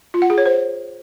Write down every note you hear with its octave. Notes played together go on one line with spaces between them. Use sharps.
F4
F#5
G#4
C#5
C5